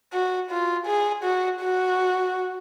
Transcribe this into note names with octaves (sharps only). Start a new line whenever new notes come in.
F#4
F4
G#4
F#4
F#4